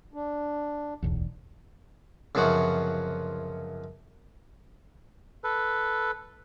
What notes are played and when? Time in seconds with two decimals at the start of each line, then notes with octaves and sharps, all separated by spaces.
0.14 D4
1.02 D1 B1 E2
2.35 C#2 F#2 C3 F3 F#4 F#5
5.44 A4 B4